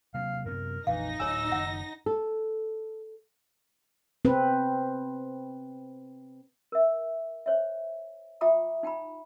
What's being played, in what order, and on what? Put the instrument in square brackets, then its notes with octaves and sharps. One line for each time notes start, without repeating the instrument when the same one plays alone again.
[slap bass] C3 F#3 A#3 [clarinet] F5
[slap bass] F#2 C3 B3 [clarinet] A#4
[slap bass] A#1 F2 A#2 [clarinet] E3 [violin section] D#4 A#6 [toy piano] F5
[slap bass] D1 A2 [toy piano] C#5 G#5 [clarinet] E6
[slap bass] F#1 D#3 [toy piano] F#5
[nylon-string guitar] A4
[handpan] C4 B4
[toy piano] A#4 E5
C5 C#5 E5
F4 E5 G5 A#5 D6 D#6
D#4 G5 A#5 B5